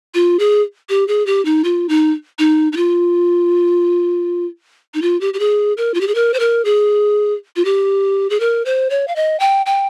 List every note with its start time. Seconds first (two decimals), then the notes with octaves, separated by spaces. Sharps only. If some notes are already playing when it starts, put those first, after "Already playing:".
0.14 F4
0.39 G#4
0.89 G4
1.08 G#4
1.26 G4
1.45 D#4
1.64 F4
1.89 D#4
2.39 D#4
2.72 D#4
2.77 F4
4.94 D#4
5.02 F4
5.21 G4
5.34 G4
5.39 G#4
5.77 A#4
5.94 F4
6.01 G4
6.08 G#4
6.15 A#4
6.34 C5
6.40 A#4
6.65 G#4
7.56 F4
7.65 G4
8.30 G#4
8.40 A#4
8.66 C5
8.90 C#5
9.08 F5
9.16 D#5
9.40 G5
9.66 G5